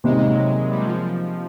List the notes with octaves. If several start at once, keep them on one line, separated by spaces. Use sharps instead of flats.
C3 D#3 G3 G#3 A#3 D#4
G#3
F#3
G3
F#3
F3